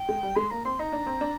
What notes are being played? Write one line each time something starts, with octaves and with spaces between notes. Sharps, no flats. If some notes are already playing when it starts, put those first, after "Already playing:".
Already playing: G5
G#3
G3
G#3 C6
A#3 A#5
C4 C6
D#4 A#5
D4
C4
D4